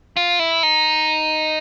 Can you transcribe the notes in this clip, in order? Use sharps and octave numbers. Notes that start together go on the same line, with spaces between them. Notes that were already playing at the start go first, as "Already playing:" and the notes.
F4
E4
D#4